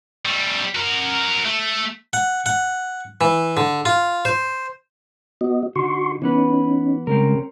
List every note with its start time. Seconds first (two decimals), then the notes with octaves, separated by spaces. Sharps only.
0.25 G3 A3
0.75 F#4 A#4
1.45 A3
2.13 F#5
2.46 F#5
3.21 E3
3.57 D3
3.85 F4
4.25 C5
5.41 B3 F#4 D#5
5.76 D3 D#4 F#4 C6 C#6
6.22 E3 B3 C#4 D#4 B4
7.07 C#3 G3 G#3 C4 C#4 A#4